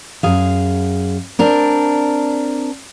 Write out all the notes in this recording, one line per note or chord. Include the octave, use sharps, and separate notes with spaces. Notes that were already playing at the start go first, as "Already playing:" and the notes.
F#2 G#4 F5
C4 D4 A#4